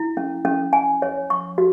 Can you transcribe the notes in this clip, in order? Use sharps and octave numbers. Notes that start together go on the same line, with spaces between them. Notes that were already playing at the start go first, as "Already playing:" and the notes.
Already playing: E4
C#4
C#4
G#5
C#5
C#6
F#4